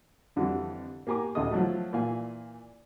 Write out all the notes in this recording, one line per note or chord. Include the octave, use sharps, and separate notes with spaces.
F2 D3 E3 G3
A#3 G4 G#5 A#5 D6
A1 D2 C#3 A4 D#5 D#6
F3 F#3 A3
A#2 E3 F5 G#5